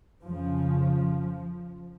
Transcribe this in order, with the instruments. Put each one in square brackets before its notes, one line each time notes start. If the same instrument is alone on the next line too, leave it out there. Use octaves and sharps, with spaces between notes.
[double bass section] F2 C#3 F3